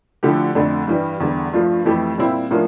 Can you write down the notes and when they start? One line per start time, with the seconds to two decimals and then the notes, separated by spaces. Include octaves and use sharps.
0.23 D3 F3 A3 E4 G4
0.55 F2 D3 A3 D4
0.87 G2 E3 G3
1.20 E2 D3 G3
1.53 G2 F3 A3 D4 F4
1.85 F2 E3 A3 E4 G4
2.18 A#2 G3 C4 E4
2.51 A2 F3 A#3 D4 F4